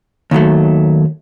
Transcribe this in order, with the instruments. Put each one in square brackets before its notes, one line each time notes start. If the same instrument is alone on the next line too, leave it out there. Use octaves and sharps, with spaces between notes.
[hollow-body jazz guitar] D#2 D#3 F#3 A3